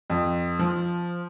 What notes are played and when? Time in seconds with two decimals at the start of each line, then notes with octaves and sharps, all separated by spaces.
0.10 F2
0.59 F3